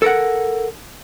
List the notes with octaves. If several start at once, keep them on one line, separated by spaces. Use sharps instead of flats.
A4 A#4 F#5